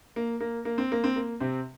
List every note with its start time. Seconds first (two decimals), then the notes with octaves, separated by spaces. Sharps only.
0.16 A#3
0.41 A#3
0.65 A#3
0.78 C4
0.92 A#3
1.04 C4
1.16 A#3
1.40 C3 C4